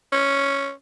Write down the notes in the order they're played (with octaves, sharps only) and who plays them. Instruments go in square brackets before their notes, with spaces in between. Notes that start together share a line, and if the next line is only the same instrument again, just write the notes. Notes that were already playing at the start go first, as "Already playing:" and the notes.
[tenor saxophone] C#4